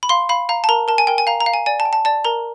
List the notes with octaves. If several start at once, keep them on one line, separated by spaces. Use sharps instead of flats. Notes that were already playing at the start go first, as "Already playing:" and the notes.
B5
F5 C6
F5 B5
F5 A#5
A5
A#4 A#5
A#4 A5
G#5
A#4 G5
G#5
F5 A#5
A#5
F5
G#5
D5 G#5
A5
G5
A5
D5 A5
A#4 A#5